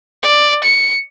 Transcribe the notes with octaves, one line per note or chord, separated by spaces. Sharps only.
D5
C#7